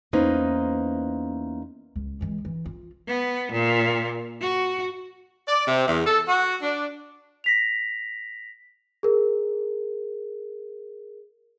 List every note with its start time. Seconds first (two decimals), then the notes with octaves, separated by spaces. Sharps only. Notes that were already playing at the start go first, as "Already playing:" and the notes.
0.13 E2 A#3 C#4 D#4 B4 C5
1.96 C#2
2.21 E3 G#3
2.45 E3
2.66 F4
3.08 B3
3.52 A#2
4.41 F#4
5.48 D5
5.68 C3
5.87 E2
6.06 A4
6.28 F#4
6.63 D4
7.44 A#6 B6 F7
9.03 G#4 A#4